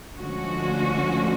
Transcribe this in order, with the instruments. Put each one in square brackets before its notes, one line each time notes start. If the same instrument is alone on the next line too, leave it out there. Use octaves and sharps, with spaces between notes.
[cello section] D2 D3 F3 G#3 C#4 F#4